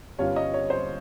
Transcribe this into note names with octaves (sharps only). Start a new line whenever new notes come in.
G1 G2 G3 C#4 F4 C#5
D#5
C#5
C5